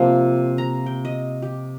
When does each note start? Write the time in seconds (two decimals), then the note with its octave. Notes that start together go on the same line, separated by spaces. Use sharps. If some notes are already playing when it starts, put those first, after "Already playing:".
Already playing: C3 F3 A#3 F5
0.58 A#5
0.86 G5
1.05 D#5
1.42 G4